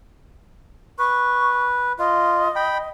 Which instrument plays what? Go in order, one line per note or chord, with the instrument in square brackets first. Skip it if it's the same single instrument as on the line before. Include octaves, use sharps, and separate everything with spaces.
[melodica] B4 [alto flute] C#6
[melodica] F4 [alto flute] D#5
[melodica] G5 B5